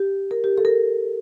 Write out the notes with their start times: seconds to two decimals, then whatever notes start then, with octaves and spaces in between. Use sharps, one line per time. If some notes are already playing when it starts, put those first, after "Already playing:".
Already playing: G4
0.31 A#4
0.44 G4
0.58 A4
0.65 A#4